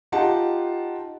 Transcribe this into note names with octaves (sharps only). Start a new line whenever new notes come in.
D#4 F4 G4 F#5 G5 A5